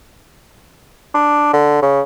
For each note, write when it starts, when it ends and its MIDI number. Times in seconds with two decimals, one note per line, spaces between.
1.14 1.49 62
1.53 1.81 50
1.82 2.01 49